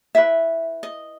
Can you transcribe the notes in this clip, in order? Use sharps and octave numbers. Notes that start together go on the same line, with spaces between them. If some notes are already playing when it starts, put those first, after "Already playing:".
E4 B4 E5
D#5